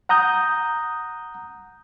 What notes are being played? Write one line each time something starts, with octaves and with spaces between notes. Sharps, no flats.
F#5 A#5 D#6 G6